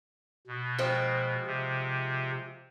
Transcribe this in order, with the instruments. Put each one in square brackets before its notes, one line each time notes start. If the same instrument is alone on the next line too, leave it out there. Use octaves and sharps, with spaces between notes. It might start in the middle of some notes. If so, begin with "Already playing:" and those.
[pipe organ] B2
[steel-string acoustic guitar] F3 G#3 C4
[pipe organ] C3